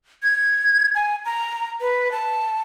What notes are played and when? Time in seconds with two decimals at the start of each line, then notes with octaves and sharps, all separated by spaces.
0.23 G#6
0.95 G#5
1.25 A#5
1.81 B4
2.12 A5